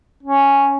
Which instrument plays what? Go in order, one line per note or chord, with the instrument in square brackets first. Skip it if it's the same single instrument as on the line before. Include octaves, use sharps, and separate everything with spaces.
[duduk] C#4